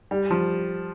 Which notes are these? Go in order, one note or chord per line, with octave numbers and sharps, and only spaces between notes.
G3
F3